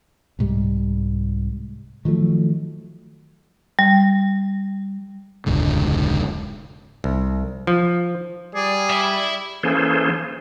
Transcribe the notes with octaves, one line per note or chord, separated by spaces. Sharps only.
C2 G#2 G3
D#3 F3 F#3 A3
G3
E1 C#2 G#2 D3
C2
F3
G3 G#4 D5
D5 E5 B5
E3 A#3 C#4 G#4 A4 C5